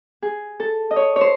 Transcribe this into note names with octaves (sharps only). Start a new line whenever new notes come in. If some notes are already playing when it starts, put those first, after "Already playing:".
G#4
A4
D#5
C#5
C5 C#5